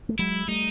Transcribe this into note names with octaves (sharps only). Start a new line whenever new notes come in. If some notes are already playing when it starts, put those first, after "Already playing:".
A3
F#3 G#3 E4
G3 A3 D#4